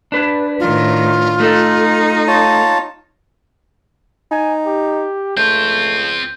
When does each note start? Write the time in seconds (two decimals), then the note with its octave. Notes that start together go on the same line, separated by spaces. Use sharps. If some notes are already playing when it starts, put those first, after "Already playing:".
0.12 D4 B4
0.60 A2 D#3 F4
1.40 A3 D#4 A4
2.27 F4 C#5 A5
4.31 D#4 G#5
4.66 G4
5.37 C#2 A3 C4 F4 G6